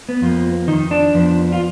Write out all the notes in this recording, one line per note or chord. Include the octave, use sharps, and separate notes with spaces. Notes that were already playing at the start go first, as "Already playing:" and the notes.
B3
F2 F3 A#3
F2 D#3 D#4
D4
F2 F3 B3
F4